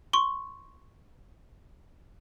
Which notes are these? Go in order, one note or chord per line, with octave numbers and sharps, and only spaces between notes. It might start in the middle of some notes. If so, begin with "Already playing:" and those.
C6 C#6